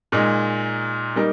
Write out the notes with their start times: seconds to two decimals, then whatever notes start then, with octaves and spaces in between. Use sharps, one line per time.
0.12 A#2 G#3 D#4
1.16 G3 A#3 D#4 A#4